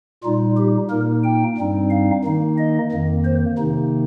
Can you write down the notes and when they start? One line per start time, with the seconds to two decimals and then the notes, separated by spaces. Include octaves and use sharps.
0.23 A#2 G3 D#4 F4
0.57 G4
0.90 A#2 A#3 D#4 A#4
1.24 G5
1.57 G2 G3 C4 D#4
1.90 F5
2.25 D#3 A#3 D#4
2.58 D#5
2.92 F2 D#3 A#3
3.25 C5
3.58 C3 D#3 A#3 D#4